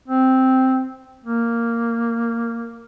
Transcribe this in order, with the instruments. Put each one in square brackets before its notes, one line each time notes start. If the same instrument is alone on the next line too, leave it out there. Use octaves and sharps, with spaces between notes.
[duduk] C4
A#3